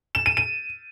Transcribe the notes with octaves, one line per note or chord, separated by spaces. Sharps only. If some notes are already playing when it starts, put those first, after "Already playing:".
E7
D#7
D#7